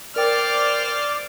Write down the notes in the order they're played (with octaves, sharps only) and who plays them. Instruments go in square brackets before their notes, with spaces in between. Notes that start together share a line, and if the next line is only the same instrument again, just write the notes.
[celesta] A#4 G5 [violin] C5 F6 [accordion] D5 D6